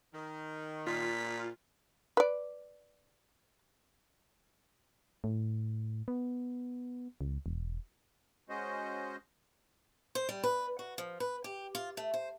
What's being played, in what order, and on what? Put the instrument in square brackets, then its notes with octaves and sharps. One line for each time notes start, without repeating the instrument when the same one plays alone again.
[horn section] D#3
[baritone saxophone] A#2 [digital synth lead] F4 [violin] B6
[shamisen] B4 D5
[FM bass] A2
B3
C#2
E1
[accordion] G#3 C#4 F#4 C5 D#5
[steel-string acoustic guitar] C5
G3
B4
F#4
F3
B4
G4
F4
A3
C5